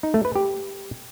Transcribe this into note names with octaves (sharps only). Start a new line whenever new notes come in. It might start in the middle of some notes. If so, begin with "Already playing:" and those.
D#4
A3
B4
G4